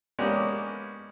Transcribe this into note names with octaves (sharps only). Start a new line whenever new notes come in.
G#3 A#3 B3 C#4 D4 G4